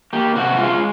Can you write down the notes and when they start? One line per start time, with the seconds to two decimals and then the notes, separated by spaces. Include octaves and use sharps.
0.13 A#3 G4
0.35 C3 F#4
0.57 G#3 F4